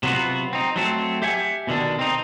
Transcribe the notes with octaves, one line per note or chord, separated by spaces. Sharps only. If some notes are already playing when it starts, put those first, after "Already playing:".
C3 F#3 B3 F4 F#4
C4 D#4
F#3 A3 C4
G4 E5 F#5 G#5
B2 D3 D#3 D4
C4 D#4